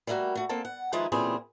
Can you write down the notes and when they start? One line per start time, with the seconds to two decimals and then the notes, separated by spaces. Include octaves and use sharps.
0.07 G3 A3 A#3 D#4 F#4
0.35 A3 F#4
0.49 A#3 C4 A4 A5
0.65 F#5
0.93 D#3 F3 G#3 D#4 E4 B4
1.12 A#2 C#3 E3 G3 C4 G#4